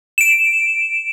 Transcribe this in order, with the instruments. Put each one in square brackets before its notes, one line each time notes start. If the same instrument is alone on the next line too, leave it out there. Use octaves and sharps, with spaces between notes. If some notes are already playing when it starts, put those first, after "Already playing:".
[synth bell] D7 E7